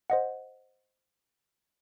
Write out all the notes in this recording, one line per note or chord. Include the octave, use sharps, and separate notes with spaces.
C5 D#5 F#5